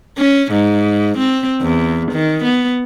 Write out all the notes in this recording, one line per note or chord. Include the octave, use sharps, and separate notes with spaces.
C#4
G#2
C4
E2
D#3
B3